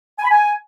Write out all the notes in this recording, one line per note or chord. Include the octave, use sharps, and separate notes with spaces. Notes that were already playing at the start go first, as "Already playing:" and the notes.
G#5
B5
G#5